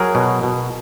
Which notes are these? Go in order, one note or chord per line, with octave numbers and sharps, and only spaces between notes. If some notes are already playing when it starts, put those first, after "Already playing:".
Already playing: F#3 G#4 A#4
B2
B2